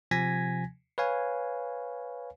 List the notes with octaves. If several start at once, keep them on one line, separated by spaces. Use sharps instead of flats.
C3 F3 G#5 G#6 A#6 B6
B4 C#5 F5 G#5